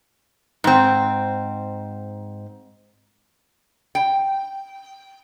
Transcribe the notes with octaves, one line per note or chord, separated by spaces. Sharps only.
G#2 C4
G5